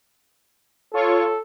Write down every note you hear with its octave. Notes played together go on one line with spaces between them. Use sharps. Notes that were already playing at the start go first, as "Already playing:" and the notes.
F4 A4 C#5 C#6